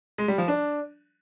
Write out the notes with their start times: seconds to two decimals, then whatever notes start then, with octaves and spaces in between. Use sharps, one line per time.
0.18 G#3
0.28 G3
0.38 F3
0.48 D4